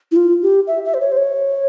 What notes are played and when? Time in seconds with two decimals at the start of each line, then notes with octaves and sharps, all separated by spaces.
0.12 E4
0.16 F4
0.43 G4
0.67 E5
0.85 E5
0.94 C5
1.00 C#5
1.12 C5
1.17 C#5